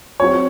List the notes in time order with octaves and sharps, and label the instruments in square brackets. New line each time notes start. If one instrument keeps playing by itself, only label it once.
[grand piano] F#3 C4 F#4 [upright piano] C#5